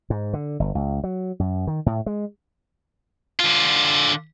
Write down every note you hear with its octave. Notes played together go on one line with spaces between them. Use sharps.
G#2
D3
G1
C#2
F#3
F#2
D#3
A2
G#3
D3 F4